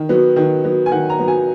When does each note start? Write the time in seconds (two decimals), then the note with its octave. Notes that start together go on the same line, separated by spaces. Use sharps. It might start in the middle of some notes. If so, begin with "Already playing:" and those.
Already playing: D#3
0.09 F#3 B3
0.36 D#3
0.64 F#3 B3
0.86 G#5
0.92 D#3 F#5
1.10 A#5
1.19 F#3 B3
1.28 G#5